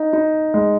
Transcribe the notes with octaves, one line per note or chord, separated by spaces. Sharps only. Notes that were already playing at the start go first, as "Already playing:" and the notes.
Already playing: D#4
D#4
G#3